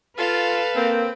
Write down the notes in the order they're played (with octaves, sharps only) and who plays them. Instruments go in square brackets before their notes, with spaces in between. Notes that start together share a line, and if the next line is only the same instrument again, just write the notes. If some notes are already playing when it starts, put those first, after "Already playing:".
[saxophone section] F4 [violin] A4 F5 [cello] B4
[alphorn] A#3 [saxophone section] C4